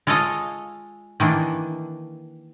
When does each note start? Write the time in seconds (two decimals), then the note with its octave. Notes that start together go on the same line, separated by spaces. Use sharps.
0.07 G#3 F4 A4 C#5 D#5 F5
1.20 D#3 E3 A#3 D4